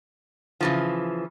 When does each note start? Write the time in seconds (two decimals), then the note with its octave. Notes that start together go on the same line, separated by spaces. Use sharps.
0.61 C#3 E3 F3